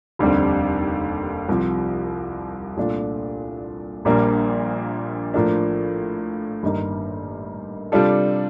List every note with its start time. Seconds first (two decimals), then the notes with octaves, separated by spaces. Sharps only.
0.19 F1 D#2 D3 G3 C4
1.49 C2 C3 F3
2.77 C2 A#2 A3 D4 F4
4.05 A#1 A#2 G3 A#3 D4
5.34 A2 F3 A#3 D4
6.63 G1 G2 D#3 A#3
7.92 C3 G3 D4 F4 A4